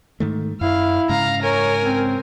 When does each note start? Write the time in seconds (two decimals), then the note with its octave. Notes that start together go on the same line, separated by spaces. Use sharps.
0.20 G#2 D#3 A3
0.61 F#2 E4 F5
1.09 G#2 C#3 F5 A#5
1.42 A#4 C#5 G#5
1.81 C4